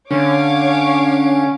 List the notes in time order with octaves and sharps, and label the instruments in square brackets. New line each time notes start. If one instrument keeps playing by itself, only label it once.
[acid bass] D3 [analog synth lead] C#4 [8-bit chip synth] D4 [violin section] C#5 F5 D6